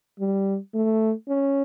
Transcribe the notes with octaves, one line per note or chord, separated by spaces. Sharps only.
G3
A3
C#4